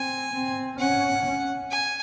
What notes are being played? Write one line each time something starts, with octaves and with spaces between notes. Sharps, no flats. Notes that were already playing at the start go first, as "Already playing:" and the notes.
Already playing: C4 G#5
C4
C#4 F#5
C#4
G#5